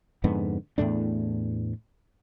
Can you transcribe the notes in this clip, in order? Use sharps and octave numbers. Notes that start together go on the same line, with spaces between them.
F2 G#2 D3 B3
E2 A2 A3 D4